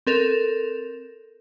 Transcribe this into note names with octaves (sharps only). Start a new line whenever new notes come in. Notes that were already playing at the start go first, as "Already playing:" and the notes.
C4 A4 A#4